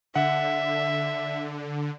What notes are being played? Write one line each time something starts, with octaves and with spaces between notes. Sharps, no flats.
D3 E5 F#5